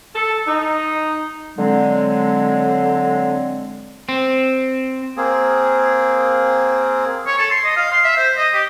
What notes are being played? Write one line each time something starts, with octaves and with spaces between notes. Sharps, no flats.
A4
D#4
D3 F#3 G#3 C4
C4
A#3 C4 G#4
C#5
A4
C6
D#5
F5
C6
E5
C5
D#5
G4